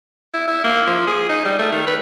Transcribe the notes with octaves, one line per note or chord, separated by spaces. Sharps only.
E4
E4
A#3
F3
G#4
D#4
G3
A3
D#3
B4